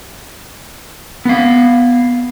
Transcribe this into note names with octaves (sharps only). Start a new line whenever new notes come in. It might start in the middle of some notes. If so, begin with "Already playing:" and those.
B3 F5